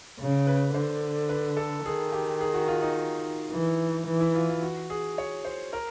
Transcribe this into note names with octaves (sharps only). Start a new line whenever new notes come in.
C#3
B4
D3 C5
B4
A4
D#3 G#4
G4
G#4
F#4
F4
D#4
E3
E3
E4
F4
F4
F#4
G#4
C#5
C5
A#4